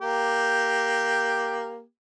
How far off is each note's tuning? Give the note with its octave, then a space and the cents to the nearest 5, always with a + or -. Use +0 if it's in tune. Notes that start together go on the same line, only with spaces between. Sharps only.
A#3 +0 G4 +0